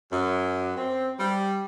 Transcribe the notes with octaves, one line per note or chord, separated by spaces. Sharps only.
F#2
C4
G3